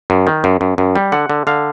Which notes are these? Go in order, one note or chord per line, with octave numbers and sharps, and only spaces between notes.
F#2
D#3
F#2
F#2
F#2
G3
D3 F#5
D3
D3 F5